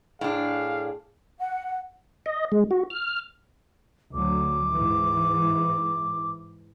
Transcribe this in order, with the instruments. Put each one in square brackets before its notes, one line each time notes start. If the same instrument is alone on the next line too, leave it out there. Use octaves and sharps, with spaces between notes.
[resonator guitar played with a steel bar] A2 D4 [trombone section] G#4 [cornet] F5
[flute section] F#5
[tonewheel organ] D#5
G#3
F#4
F6
[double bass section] D2 F#3 [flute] D6
[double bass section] G#2 E3